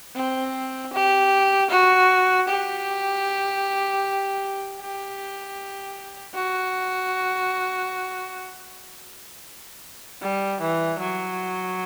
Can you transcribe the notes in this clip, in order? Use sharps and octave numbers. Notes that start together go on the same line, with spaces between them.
C4
G4
F#4
G4
G4
F#4
G3
E3
F#3